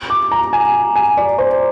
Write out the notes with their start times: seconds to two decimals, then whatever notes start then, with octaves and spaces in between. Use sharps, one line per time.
0.10 D6
0.32 A#5
0.53 G#5
0.96 G#5
1.17 D5
1.39 C5